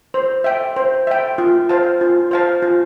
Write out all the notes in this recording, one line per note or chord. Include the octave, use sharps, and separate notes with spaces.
C5
E5 G5
C5
E5 G5
F4
C5 F5 A5
F4
C5 F5 A5
F4